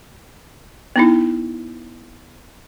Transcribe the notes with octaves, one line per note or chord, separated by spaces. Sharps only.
B3 D#4 E4